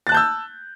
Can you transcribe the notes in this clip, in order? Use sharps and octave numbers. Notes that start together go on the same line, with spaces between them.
A5 E6 F#6 G6 A6